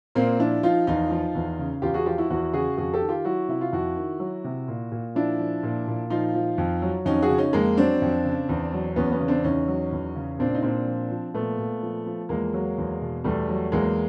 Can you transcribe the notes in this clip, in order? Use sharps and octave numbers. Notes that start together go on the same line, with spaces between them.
A#2 A#3 C4
F3 D4 E4
F3 D#4 F4
E2 D#4 F4
F3
E2
C#3
E2 F4 G4
F#4 G#4
F3 F4 G4
E4 F#4
E2 E4 F#4
C#3 F#4 G#4
F2 F#4 G#4
G4 A4
D#3
F4 G4
F#3 E4 F#4
C3 E4
F4
F2 E4 F#4
D#3
F#3
C3
A#2
A#2
F3 D4 E4
F3
A#2
A#2
F3 D#4 F4
F3
F2
F#3
F2 C#4 D#4
F#4 G#4
C#3
C#4 D#4
F2 G#3 A#3
F#3 C4 D4
F2
C#3
E2
F#3
E2 B3 C#4
B3 C#4
C#3
C4 D4
E2 C#4 D#4
F#3
E2
C#3
A#2 C4 D4
D#4
A#2 C4 D4
F3
F3
A#2 A3 B3
A#2
F3
F3
E2 G#3 A#3
F#3
E2
B2
E2 G3 A3
F#3
E2 G#3 A#3